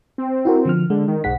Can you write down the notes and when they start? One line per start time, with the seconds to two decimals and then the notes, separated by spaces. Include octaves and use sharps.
0.18 C4
0.45 E4 F#4 A#4
0.65 D3 F3 F6
0.90 D3 G#3
1.08 D#3
1.24 B1 G#2 F#5 B6